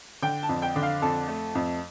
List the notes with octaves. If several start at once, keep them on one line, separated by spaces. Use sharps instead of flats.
D3 G5
A5
F2
G5
D3
F5
F2 A4
A3
F2